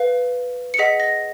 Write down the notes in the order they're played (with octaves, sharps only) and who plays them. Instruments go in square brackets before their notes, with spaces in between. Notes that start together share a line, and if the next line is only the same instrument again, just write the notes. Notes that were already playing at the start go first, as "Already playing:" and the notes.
Already playing: [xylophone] B4 F5
C#7
G#4 D#5 F#5 B6
A#6